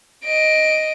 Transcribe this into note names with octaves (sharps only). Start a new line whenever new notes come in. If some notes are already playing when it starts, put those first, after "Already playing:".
D#5 D7